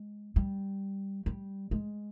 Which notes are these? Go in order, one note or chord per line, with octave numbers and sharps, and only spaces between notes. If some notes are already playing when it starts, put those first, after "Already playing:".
Already playing: G#3
G3
G3
G#3